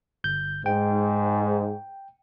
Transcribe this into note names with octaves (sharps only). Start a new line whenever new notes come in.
G1 G6
G#2 G5